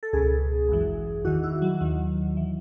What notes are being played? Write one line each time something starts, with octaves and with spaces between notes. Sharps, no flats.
A4
C#2 B2 G#4
G#1 F#2 E3
E2 D#3 F#4
E4
F#3
D#2 D#3 F#3
E3